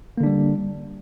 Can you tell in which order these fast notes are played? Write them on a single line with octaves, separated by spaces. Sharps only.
A#3 D3 D4 G3